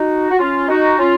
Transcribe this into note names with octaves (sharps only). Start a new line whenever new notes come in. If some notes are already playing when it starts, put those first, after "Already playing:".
Already playing: D#4 F#4
F#4
C#4 F4
D#4 F#4
C#4 F4